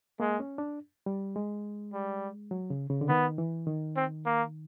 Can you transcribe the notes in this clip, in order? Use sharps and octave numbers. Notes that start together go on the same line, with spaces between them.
G#3 A#3
C#4
D4
G3
G#3
G3
F#3
C#3
C#3
D3
D#3 B3
E3
D#3
C4
A#3